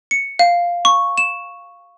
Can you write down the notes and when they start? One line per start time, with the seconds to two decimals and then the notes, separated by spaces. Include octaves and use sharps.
0.11 C#7
0.39 F5
0.85 C#6
1.18 E7